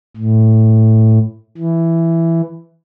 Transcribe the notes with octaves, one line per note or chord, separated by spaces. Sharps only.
A2
E3